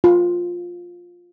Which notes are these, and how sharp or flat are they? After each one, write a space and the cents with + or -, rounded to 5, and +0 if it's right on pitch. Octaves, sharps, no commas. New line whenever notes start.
F4 +10